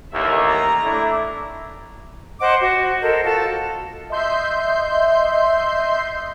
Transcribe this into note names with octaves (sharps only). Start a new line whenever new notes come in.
A1 D#2 E5
A#5
A3 D4 E4
C5 D#5 F#5 D6
F#4
A4 A#4 C5 D#5
F4 F#4 A4 A5
D#5 E5 C6 G6 C7